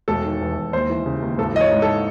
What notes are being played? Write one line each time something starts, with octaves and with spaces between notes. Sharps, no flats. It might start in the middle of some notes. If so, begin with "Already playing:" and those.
E1 A4
D#3
E2
E1
D#2 C5
E3
C#3
D#2
G#1 A4
E3 D#5
C#5
G#2
A4